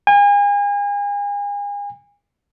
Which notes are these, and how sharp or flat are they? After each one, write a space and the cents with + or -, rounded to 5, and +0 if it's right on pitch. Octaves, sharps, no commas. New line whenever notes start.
G#5 -35